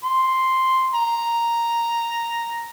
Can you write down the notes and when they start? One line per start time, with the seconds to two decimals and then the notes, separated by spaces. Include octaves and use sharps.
0.04 C6
0.94 A#5